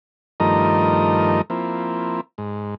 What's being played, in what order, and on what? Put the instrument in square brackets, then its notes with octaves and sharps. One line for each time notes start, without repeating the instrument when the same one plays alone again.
[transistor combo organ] G2 D#3 F3 A3 A#4 D#5
F3 A#3 C4 E4
G#2